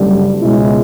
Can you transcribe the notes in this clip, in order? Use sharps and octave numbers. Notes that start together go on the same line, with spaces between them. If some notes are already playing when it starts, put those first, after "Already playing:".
Already playing: F#1 F#2 D3 G3
C#2 B2 G#3 C#4 E4